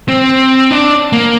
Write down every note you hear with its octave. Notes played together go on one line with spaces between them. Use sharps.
C4
D4
A#3